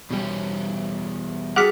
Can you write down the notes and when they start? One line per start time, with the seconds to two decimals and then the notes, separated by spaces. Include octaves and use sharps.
0.11 E2 B2 G3 C#4
1.56 G3 F#4 G#4 A4 F#5 D6 F6 B6